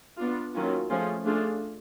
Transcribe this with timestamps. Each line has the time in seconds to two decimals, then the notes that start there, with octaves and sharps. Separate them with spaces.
0.17 B3 D4 F4
0.53 D#3 F#3 A#3 C#4 F4
0.89 F3 A3 C#4 F4 G#4
1.25 A3 D4 F4 G#4